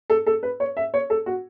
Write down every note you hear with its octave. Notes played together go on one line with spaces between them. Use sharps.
A4
A4
B4
C#5
E5
C#5
A4
F#4